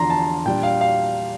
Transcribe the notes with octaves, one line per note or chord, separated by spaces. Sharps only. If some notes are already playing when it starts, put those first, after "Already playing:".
Already playing: E2 D3 F3 A#5 C6
A5
A#2 G3 D4 G5
F5
F5